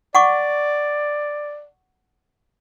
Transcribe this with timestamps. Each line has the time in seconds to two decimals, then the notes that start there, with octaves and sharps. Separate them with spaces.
0.15 D5 F#5 C#6 D6